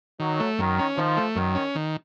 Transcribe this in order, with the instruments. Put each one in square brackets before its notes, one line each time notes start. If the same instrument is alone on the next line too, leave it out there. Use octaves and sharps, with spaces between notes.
[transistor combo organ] D#3 [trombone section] F#3
[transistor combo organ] A3
[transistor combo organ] F#2 [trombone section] D#3
[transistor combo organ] C#4
[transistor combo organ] D#3 [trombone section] F3
[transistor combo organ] A3
[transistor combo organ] F#2 [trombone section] D#3
[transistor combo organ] C#4
D#3